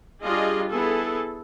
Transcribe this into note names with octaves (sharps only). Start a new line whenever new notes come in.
G3 D4 F4 G#4 D#5
B3 E4 G#4 A4